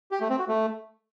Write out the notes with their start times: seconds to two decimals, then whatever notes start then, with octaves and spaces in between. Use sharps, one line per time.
0.11 G4
0.21 A3
0.30 C4
0.39 F#4
0.48 A3